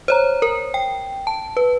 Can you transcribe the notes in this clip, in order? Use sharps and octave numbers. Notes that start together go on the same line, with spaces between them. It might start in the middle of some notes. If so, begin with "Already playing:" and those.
C5 C#5 A#5
A#4
G5
A5
B4